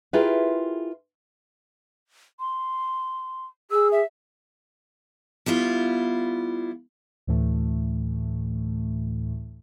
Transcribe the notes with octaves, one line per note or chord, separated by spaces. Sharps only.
E4 F4 G4 G#4 A#4 B4
C6
G#4 E6
E5
G3 B3 E4 F4
D2 A2 E3 A3